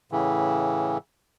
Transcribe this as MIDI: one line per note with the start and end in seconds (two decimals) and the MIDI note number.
0.12 0.98 45
0.12 0.98 49
0.12 0.98 52